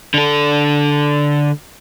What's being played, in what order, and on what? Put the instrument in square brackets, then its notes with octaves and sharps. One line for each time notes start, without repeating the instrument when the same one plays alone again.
[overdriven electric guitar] D3 A4